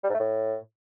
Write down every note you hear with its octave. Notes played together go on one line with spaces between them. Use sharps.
G3
G#2
A3
A2